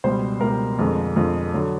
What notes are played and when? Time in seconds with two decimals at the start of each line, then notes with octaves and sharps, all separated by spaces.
0.04 C#2 B2 G3 C5
0.41 C#2 B2 G3 A#4
0.79 F2 D3 F3 G#3
1.16 F2 D3 F3 G#3
1.54 D3 F#3